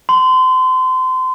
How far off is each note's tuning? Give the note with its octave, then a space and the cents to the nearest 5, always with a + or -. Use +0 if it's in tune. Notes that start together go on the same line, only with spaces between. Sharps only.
C6 -30